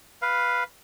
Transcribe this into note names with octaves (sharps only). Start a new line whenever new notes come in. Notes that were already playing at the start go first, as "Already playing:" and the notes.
B4 F5